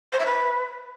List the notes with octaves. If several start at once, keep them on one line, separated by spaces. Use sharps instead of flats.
C5
E5
B4